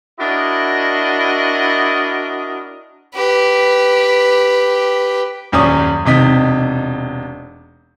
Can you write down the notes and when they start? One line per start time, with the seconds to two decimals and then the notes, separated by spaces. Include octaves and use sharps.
0.19 D4 E4 F#4 A#4 D#5
3.15 G4 B4
5.52 D#1 F#2 C#4 D5 D#6
6.05 E1 C3 D#4 B6